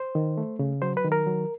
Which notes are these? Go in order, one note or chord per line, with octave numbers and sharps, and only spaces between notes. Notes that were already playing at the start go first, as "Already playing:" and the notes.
Already playing: C5
D#3
A3
C#3
F#3 C5
B4
D#3
A#4
F#3